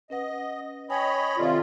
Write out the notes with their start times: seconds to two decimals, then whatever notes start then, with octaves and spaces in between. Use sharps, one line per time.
0.10 C#4 B4 D#5 F#5
0.90 C#5 D#5 G5 G#5 B5 D#6
1.37 C3 D#3 F4 A4 D5